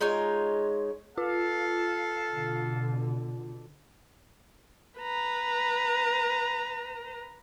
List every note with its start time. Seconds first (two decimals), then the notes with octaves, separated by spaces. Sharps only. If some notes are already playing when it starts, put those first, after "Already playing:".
0.01 G#3 D#4 F4 C#5
1.18 F4 A4 F5
2.33 B2 D3
4.99 B4 A#5